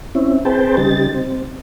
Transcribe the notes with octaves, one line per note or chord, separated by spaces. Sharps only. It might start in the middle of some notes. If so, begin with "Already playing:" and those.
C4 C#4 E4
C4 G#4 B4 C5 G5 A5
C#3 G3 D#4 G4 A6
C4